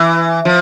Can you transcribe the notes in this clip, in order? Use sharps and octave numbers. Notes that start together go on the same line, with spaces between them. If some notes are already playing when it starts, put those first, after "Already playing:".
Already playing: E3
F3